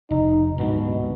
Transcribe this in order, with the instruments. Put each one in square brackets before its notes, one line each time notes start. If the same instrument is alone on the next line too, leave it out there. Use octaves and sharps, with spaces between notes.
[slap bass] F1 [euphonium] D#4
[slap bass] D1 G#2 D4 [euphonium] B2